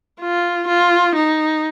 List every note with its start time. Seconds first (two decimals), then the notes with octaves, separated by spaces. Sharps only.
0.21 F4
0.68 F4
1.15 D#4